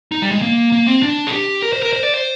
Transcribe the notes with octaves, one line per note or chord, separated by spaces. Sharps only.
D#4
G3
G#3
A#3
A#3
C4
D4
G#4
G4
A#4
C5
A#4
C5
D5
C5